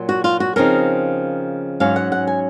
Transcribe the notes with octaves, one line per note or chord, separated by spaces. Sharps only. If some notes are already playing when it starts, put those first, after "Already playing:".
Already playing: A#2 F#3
F#4
F4
F#4
C#3 F3 C4 D#4 A#4
G#2 F#3 C#4 F5
F#5
F#5
G#5